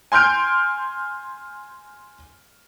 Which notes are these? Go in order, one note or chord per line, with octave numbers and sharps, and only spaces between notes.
G#5 C6 F6 G6 D7